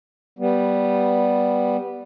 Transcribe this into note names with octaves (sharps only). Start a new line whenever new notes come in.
G3 B3